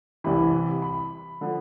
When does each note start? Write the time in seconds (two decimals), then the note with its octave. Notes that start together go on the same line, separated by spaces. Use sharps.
0.24 C2 C3 E3 B5
0.82 B5
1.41 D3 F3